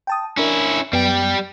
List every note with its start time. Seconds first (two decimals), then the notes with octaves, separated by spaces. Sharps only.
0.07 G5 A5 D#6
0.37 C#4 D4 E4 A#4
0.93 F#2 G3 B3 G5